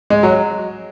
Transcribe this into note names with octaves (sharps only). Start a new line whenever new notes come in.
G#3
F#3